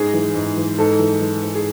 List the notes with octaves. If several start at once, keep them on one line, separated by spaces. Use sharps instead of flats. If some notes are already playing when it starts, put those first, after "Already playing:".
Already playing: G#2 G#4
E3
G#2
E3
G#2 A4
E3
E3
G#2
G#4